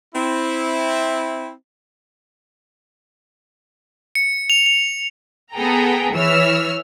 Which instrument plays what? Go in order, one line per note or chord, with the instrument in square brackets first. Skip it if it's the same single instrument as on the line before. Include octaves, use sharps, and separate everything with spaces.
[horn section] C4 E4
[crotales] C#7
F7
F7
[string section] B3 G#4 A4 G5 A#5
E3 C#5 E6 F6